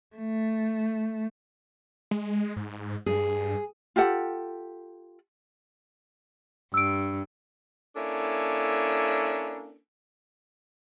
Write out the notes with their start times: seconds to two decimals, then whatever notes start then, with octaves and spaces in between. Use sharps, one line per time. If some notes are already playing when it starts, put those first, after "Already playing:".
0.16 A3
2.11 G#3
2.56 G#2
3.06 G2 G#4
3.96 F4 G4 A4 F#5
6.74 G2 E6 D7
7.96 A#3 C#4 D4 E4 A4